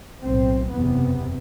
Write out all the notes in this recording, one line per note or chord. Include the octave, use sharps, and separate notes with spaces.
B1 A2 C4
F#1 E2 C3 B3